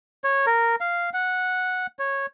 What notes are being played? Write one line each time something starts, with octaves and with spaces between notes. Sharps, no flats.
C#5
A#4
F5
F#5
C#5